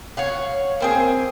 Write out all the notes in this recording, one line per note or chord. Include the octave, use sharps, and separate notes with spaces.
C#5 F5 F#5
A#3 C4 G#4